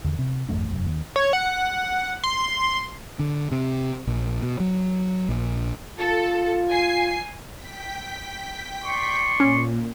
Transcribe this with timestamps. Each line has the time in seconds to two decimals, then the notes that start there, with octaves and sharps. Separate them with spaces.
0.04 E2 D3
0.19 C3
0.49 G#1 F2 A3 D4
0.70 F1 C2 F#2
0.85 D#2
1.16 C#5
1.33 F#5
2.24 C6
3.19 D3
3.52 C3
4.07 A#1
4.43 B2
4.60 F#3
5.29 A#1
5.99 F4 A4
6.68 G#5 C7
7.56 G5 B6
8.84 D5 C6 C#6
9.40 A#2 C#4